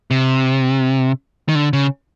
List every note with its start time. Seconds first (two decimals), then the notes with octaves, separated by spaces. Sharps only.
0.11 C3
1.49 D#3
1.55 D3
1.73 C#3